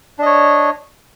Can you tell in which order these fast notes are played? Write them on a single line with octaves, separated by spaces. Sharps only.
D4 D#5 C#5